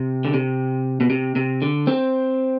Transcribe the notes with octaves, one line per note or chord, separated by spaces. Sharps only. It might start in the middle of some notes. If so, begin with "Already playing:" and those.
Already playing: C3
D3
C3
B2
C3
C3
D3
C4